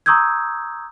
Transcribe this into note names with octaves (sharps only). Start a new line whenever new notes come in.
A#5 C#6 D#6 E6 G6 G#6